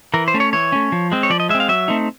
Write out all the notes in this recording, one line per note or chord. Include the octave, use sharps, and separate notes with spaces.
E3 A#4
C5
A3 C#4
C#5
E3 C#5
A3 C#4
F3
G#3 C4
C#5
F3 D5
D#5
G#3 E5
C4
F5
F#3 E5
A3 C4 D#4